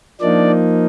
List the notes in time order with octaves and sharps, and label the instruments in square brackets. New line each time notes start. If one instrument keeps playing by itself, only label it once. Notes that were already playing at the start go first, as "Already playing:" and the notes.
[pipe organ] F3 A#3 D4 D#4 D5